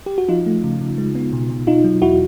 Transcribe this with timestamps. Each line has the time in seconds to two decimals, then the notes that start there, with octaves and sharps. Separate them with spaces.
0.06 G4
0.18 F#4
0.29 F3 D#4 F4
0.46 A3
0.64 C#3
0.81 C#3
0.98 G#3
1.15 B3
1.33 B2
1.50 B2
1.67 B2 D#4 F4
1.84 F#3
2.02 E2 E4 F#4